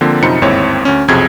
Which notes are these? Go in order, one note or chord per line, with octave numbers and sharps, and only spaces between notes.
D3 F3 A#3 C4
F#2 C3 F3 D#4 B5 C#7
G1 D#2 G#2 C4 E4 C#5
D2 C#4
B1 F2 C3 F#3 G#4 G#6